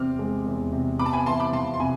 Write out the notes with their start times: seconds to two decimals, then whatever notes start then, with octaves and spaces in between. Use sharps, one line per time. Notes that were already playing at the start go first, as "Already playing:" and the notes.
Already playing: E2 C3 C4 D6 F6
0.19 G#3
0.46 E2
0.72 C3
0.99 B3 B5 D6
1.06 A5
1.13 G#5 B5
1.26 E3 A5 C6
1.40 B5 D6
1.53 F2 A5 C6
1.74 C6
1.80 C3 G#5 B5